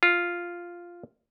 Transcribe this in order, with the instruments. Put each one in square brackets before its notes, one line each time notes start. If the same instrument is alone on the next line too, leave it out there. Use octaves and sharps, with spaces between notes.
[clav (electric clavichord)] F4